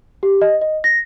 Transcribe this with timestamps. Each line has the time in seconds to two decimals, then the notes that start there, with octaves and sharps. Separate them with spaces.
0.23 G4
0.41 D#5
0.62 D#5
0.84 A#6